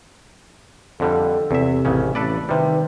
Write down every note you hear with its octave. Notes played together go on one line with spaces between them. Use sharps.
F2 D3 G3 A4
E2 C3 E5
A1 C#3 A3 C#4
A1 A4 B4 D5
C3 D#3 G3 B4